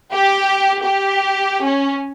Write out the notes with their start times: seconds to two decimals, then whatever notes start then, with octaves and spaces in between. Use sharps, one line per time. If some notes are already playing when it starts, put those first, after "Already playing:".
0.12 G4
0.84 G4
1.64 C#4